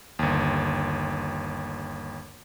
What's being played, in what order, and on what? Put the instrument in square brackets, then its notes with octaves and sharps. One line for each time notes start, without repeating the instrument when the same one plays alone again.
[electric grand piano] G1 D#2